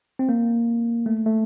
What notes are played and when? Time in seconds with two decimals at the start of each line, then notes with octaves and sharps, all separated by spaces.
0.19 C4
0.29 A#3
1.06 A3
1.26 A3